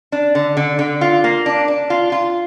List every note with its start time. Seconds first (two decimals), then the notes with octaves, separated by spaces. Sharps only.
0.12 D4
0.35 D3
0.57 D3
0.79 D3
1.01 F4
1.24 A#3
1.46 D4
1.68 D4
1.90 F4
2.12 F4